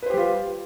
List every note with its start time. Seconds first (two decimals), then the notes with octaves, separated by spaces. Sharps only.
0.02 B4
0.06 C5
0.10 G4
0.14 G3
0.17 F4